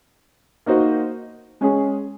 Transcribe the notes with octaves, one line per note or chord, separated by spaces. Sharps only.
A#3 D#4 F#4 C5 D#5
G#3 C#4 G#4